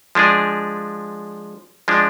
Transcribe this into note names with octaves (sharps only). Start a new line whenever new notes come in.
F3 G#3 D4 G#4
F3 G#3 D4